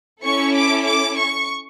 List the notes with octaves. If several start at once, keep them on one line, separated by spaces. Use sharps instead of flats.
C#4 E4 A4 C#6
D6
D6
C#6